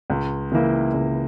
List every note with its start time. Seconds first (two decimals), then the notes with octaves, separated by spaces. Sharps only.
0.10 C#2
0.52 C#3 E3 A#3 E4
0.94 C#2